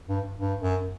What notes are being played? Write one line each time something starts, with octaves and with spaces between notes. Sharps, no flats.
G2
G2
F#2